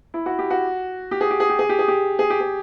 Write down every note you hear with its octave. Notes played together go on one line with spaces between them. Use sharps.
E4
F#4
G4
F#4
G4
G#4
G4
G#4
G4
G#4
G4
G#4
G4
G#4
G4
G#4